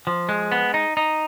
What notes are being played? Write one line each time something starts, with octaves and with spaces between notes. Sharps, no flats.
F3
G#3
B3
D#4
D#4